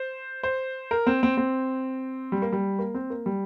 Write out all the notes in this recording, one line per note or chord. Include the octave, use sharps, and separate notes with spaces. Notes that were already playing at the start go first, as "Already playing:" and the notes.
Already playing: C5
C5
A#4
C4
C4
C4
G3
A#3
G3
A#3
C4
A#3
G3